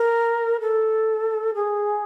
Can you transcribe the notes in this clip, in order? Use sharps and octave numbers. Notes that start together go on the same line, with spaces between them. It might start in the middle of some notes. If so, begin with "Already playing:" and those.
Already playing: A#4
A4
G#4